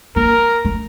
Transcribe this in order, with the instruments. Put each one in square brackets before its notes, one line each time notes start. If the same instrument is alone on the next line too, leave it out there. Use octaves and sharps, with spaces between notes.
[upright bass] A#3 [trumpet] A#4
[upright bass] A3